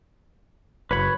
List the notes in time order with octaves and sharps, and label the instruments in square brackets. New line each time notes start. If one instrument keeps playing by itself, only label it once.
[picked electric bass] F#1 [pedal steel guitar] B4 C#5 B5